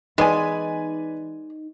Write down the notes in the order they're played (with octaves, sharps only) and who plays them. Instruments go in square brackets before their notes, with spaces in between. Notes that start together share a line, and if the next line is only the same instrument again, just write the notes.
[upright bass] E3 B3 [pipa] G#3 [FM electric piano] D#4 [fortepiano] B4 D5 G#5